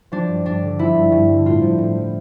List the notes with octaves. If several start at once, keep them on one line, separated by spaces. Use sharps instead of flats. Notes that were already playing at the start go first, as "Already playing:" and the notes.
F3 D4
G2
G2 D4
D3
F3 E4
G2
G2
D3
A2 F4
F3
A2
F3